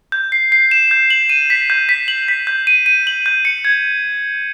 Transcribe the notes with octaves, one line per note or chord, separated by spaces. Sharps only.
G6
C7
C7
E7
G6
F#7
D#7
B6
G6
B6
F#7
B6
G6
D#7
D#7
F#7
G6
C#7
G#6